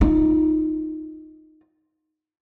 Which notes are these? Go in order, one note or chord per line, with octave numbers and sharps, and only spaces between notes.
D#4 F4